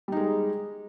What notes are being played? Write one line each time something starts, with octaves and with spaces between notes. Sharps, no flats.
G3 G#3 D#4